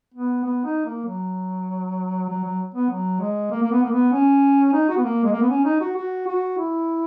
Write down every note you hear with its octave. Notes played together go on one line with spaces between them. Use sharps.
B3
B3
D#4
A#3
F#3
F#3
F#3
B3
F#3
G#3
A#3
A#3
B3
A#3
B3
C#4
D#4
F#4
B3
A#3
G#3
A#3
B3
C#4
D#4
F#4
F#4
F#4
E4